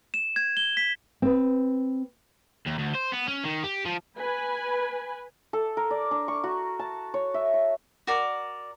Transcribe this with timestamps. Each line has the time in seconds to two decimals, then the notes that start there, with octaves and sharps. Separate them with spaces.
0.14 E7
0.36 G#6
0.57 G7
0.77 B6
1.22 C4 B4
2.66 D#2
2.78 D2
2.94 C5
3.12 B3
3.27 C#4
3.44 D#3
3.63 G4
3.85 F3
4.17 B4 G#5 B5
5.53 A4
5.77 A#4
5.91 D5
6.11 D4
6.28 C#6
6.44 F#4
6.79 A5
7.14 C#5
7.34 E5
7.54 C#5
8.07 F#4 A#4 D5